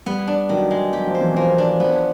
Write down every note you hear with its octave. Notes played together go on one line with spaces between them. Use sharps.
G3 B3
D4
D#3 F#3
G#3
F#3 G4
F3
C5
E3
F3 A#3
D4
F3 B3